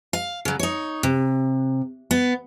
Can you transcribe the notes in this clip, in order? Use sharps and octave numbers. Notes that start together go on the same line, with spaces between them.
F5
C#3 F#3
D#4 C#5
C3
B3